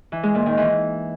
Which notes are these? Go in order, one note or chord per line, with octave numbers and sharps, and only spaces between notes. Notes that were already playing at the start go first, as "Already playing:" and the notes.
E3
G#3
A#2
D#3
E3